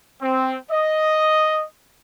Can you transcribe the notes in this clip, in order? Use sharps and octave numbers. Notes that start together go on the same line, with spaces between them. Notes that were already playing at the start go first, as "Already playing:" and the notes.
C4
D#5